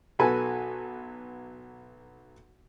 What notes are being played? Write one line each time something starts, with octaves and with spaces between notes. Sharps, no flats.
B1 F#4 A4 B4 G#5